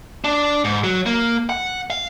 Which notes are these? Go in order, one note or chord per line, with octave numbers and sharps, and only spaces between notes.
D4
G#2
F#3
A#3
F#5
F5